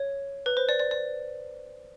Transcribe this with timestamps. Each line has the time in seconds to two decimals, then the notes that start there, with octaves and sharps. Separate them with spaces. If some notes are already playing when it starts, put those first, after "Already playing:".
Already playing: C#5
0.46 B4
0.57 C5
0.69 D5
0.79 D5
0.91 D5